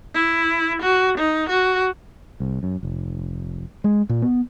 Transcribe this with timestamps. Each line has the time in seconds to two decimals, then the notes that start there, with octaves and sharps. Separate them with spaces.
0.15 E4
0.82 F#4
1.18 D#4
1.49 F#4
2.40 C2
2.63 F#2
2.83 F1
3.84 G#3
4.09 A#2
4.22 B3